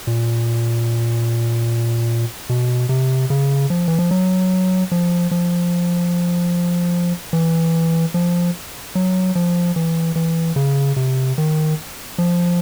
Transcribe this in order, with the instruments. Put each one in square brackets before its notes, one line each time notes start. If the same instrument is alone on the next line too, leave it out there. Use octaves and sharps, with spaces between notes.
[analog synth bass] A#2
B2
C3
C#3
F3
E3
F3
F#3
F3
F3
E3
F3
F#3
F3
E3
E3
C#3
C3
D#3
F3